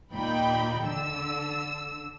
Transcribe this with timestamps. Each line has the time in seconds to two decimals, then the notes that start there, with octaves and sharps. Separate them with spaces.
0.12 D#2 A#2 D#4 G5 B5
0.83 D3 E6